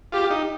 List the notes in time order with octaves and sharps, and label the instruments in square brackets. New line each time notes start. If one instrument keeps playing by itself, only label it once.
[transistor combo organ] F4 [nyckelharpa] G4
[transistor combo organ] D#4